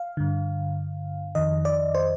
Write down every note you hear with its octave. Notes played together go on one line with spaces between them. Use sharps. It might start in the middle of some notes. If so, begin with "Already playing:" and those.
Already playing: F5
G2 D3
F2 D#3 D#5
D5
C5